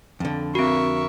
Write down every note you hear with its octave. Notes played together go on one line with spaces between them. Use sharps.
F2 D3
C4 F#4 A#4 E5 C#6